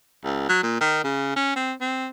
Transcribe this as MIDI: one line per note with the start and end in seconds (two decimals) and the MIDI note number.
0.24 0.48 37
0.49 0.62 54
0.63 0.80 46
0.81 1.00 51
1.04 1.33 49
1.36 1.52 61
1.56 1.73 60
1.81 2.07 60